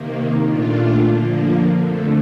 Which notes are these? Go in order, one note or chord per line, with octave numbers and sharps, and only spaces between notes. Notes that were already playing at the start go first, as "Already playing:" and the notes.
Already playing: C3 D#3 A#3
A#2 A3 D4 F4
D3 F3 A#3
F2 D3 A3